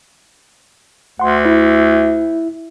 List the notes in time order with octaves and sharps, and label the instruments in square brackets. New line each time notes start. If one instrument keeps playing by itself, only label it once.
[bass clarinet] D2 [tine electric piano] F#5 C6
[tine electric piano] E4 E5